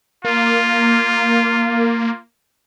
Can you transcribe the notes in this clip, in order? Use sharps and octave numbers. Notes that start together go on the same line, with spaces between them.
A#3 F4